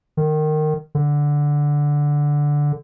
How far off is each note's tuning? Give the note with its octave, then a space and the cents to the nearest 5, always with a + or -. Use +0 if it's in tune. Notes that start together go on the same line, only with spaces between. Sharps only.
D#3 -20
D3 -5